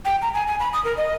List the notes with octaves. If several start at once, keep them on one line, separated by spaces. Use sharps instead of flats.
G5
A#5
G#5
G#5
B5
D#6
A#4
D#5